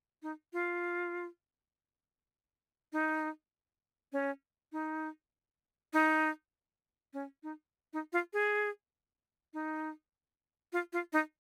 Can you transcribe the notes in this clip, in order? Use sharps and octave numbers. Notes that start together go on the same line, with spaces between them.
D#4
F4
D#4
C#4
D#4
D#4
C#4
D#4
D#4
F4
G#4
D#4
F4
F4
D#4